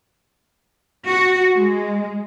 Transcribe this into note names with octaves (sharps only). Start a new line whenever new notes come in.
F#4
G#3